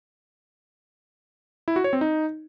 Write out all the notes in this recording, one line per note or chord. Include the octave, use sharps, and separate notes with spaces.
E4
F#4
C#5
C4
D#4